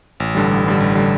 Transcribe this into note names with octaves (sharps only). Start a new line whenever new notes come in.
A1
G2 D3 G3
A1
G2 D3 G3
A1
D3 G3